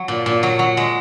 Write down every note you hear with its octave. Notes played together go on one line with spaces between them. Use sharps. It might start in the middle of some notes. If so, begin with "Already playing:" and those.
Already playing: F#3
A#2
A#2
F#3
F#3
G#3